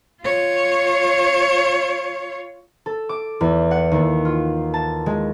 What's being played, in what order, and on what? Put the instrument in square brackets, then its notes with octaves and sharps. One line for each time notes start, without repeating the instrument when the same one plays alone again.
[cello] F4 C#5
[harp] A4
D6
E2
F#5
D#2
F4
A5
G#3